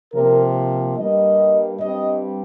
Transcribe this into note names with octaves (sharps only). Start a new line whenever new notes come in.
C3 F3 A#3 A#4
C5
G2 G3 A#3 D#5
G2 G3 C4 D#5